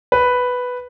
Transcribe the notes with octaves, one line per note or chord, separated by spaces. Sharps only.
B4